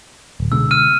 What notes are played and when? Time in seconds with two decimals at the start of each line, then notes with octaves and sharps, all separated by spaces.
0.40 D1
0.52 B2 D3 G#3 E6
0.71 F6 D#7